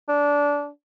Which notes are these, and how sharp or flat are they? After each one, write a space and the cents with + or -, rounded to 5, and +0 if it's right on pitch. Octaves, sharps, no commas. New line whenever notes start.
D4 -20